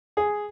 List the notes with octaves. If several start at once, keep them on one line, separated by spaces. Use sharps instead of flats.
G#4